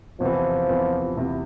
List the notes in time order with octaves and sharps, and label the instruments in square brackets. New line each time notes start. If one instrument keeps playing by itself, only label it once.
[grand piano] E2 C3 E3 [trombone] F3
[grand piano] E2 C3 E3
E2 C3 E3